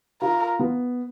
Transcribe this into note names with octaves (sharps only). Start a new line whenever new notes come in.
F4 A#4
B3